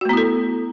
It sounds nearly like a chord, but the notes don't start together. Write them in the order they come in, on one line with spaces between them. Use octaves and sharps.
F#4 A3 B3 E4 A4